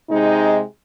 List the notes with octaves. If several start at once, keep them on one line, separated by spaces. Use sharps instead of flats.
C3 G#3 D#4